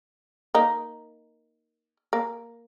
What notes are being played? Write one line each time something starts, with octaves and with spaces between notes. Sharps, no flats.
A#3 D#4
A#3